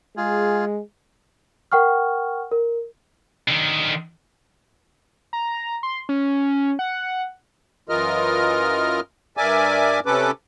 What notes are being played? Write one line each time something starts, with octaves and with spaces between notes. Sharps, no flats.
G#3 F4 G#4
A#4 F#5 G5 C#6 F6
A#4
D3 D#3
A#5
C6
C#4
F#5
F#2 E3 F4 A#4 D#5 F6
G2 A#4 D5 E5 G#5 D6
C3 C#4 A4 B4 D6